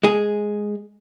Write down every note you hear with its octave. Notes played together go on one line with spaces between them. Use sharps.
G#3 G#4